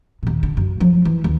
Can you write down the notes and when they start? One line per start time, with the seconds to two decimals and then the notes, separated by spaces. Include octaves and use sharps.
0.23 D#2 A#2
0.43 D3
0.57 F#2
0.80 F3 F#3
1.05 E3
1.24 D#2